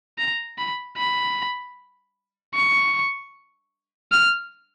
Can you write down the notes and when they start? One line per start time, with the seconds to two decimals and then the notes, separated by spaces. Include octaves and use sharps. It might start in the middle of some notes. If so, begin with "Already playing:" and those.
0.18 A#5
0.58 B5
0.98 B5
2.55 C#6
4.12 F6